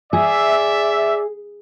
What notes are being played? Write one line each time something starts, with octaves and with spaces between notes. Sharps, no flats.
G#4 D5 E5